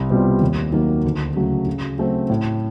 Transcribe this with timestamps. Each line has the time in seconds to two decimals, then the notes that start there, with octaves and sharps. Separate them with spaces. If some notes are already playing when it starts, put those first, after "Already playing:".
Already playing: C2
0.10 B2 G3 C4 F4
0.41 D#2
0.72 D#3 F#3 A#3
1.04 D2
1.36 C#3 F#3 A3
1.67 C#3
1.98 F#3 A3 C4
2.30 A2